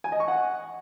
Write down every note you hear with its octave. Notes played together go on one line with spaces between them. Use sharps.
G#5
D#5
C#6
F#5